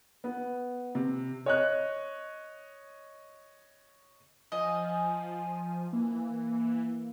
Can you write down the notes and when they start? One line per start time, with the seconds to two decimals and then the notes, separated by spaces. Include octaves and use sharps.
0.24 B3
0.95 C3
1.46 C#5 D#5 F#6
4.52 F3 D#5 G#5
5.93 E3 A#3